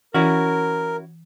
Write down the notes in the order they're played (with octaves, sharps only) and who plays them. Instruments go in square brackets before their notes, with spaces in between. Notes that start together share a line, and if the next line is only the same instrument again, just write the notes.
[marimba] E3 [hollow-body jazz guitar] C#4 E4 F#4 [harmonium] A#4